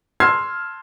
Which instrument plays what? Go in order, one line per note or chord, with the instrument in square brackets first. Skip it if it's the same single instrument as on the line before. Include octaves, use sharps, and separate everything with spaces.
[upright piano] A5 C6 E6 F6 G#6 C7